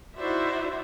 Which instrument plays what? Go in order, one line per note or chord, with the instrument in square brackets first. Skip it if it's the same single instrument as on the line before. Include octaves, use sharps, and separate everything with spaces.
[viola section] D#4 E4 F#4 C5 D5 E5